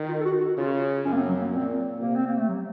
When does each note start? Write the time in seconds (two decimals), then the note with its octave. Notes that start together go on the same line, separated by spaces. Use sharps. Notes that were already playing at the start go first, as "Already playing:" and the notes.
Already playing: D#3
0.09 F4
0.20 A4
0.25 F#4
0.41 F#4
0.57 C#3 F4
1.05 F#2 C#4
1.12 A#3
1.17 C4
1.29 F#3
1.41 A#3
1.53 A#2 C4
2.00 C3 A#3
2.16 C4
2.27 A#3
2.38 A3
2.49 F#3